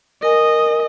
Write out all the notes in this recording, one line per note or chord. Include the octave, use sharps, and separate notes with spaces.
A#4 D#5 G#5